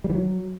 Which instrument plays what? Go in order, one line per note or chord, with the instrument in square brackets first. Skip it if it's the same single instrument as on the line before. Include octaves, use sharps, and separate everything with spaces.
[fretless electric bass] G3
E3
F#3